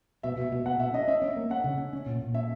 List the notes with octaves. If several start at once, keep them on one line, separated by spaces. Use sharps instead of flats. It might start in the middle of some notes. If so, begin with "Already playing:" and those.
B2 E5
B2
B2
B2 F#5
B2 E5
C#4 D#5
C#4 E5
C#4
A#3
C#4 F#5
C#3
C#4
C#4
A#2
A#2
C#4 E5